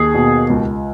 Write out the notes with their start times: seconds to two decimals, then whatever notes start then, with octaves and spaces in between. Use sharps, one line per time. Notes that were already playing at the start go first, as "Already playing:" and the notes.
Already playing: D#2 G#4
0.15 B2
0.50 C#2